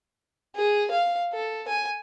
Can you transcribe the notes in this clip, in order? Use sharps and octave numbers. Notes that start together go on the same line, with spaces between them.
G#4
F5
A4
G#5